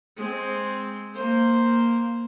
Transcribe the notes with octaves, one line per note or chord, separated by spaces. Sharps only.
G#3 C4
A#3 C5